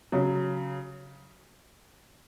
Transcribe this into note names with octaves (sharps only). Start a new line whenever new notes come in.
C#3 F#3